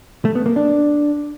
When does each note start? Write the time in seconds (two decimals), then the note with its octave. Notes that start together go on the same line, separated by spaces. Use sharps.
0.25 A3
0.35 B3
0.46 A#3
0.56 D4